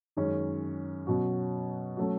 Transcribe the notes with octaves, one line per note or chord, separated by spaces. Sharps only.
F#2 D#3 G#3 C#4
B2 F#3 C#4 F#4
F#3 A3 C#4 F#4